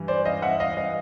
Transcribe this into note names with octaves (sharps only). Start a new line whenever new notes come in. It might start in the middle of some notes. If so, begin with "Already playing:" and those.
Already playing: G2 E3
C5 D5
D#5 F5
E5 F#5
D#5 F5
D#5 F5